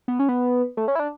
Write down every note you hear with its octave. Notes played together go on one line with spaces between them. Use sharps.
B3
C#4
B3
A3
C#4
E4
D4